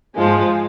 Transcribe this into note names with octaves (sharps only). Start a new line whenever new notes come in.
G#2 F3 G#3